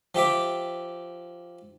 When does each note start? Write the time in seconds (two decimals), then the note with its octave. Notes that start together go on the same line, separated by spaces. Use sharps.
0.15 F3 G4 E5 D6